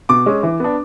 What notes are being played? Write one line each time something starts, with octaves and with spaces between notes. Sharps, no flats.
B2 D6
G#3 C#4
E3
B3 D4